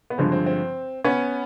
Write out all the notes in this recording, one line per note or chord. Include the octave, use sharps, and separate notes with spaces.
B3
G2 D3 F3 G#3 C4
C4
C4
B3 C#4